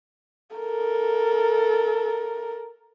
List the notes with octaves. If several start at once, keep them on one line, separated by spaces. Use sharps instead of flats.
A4 A#4